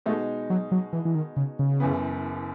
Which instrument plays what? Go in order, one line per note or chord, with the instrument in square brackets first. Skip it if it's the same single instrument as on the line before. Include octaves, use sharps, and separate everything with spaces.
[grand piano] B2 G#3 D#4 F#4 [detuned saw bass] A3
[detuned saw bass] F#3
F#3
E3
E3
D#3
C#3
C#3
[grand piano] F#1 F#2 E3 B3